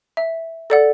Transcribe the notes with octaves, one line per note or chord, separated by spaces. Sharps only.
E5
A4 D5 F#5